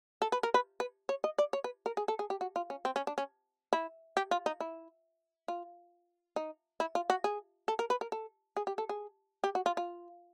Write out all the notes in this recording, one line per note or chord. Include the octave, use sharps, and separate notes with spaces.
A4
B4
A#4
B4
B4
C#5
D#5
D5
C#5
B4
A#4
G#4
A4
G#4
G4
F#4
F4
C#4
C4
C#4
D4
C#4
E4
G4
F4
D#4
E4
F4
D#4
E4
F4
F#4
G#4
A4
A#4
B4
A#4
A4
G#4
G4
A4
G#4
G4
F#4
F4
F4